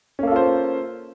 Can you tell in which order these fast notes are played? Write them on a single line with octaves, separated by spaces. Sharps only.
C#4 A#3 A4 F4 C5